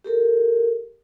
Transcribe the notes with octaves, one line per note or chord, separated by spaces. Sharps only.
G4 A4 A#4